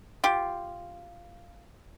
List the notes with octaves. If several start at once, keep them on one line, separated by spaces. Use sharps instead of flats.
F4 G4